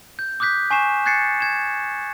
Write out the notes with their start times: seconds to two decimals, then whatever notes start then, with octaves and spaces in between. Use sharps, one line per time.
0.19 G6
0.40 D6 D#6 F#6 G6 B6
0.71 G#5 C#6 C7 E7
1.06 F#6 G#6 A6 C7 C#7
1.40 G#6 E7